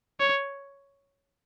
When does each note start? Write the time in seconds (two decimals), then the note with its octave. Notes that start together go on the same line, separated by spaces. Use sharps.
0.20 C#5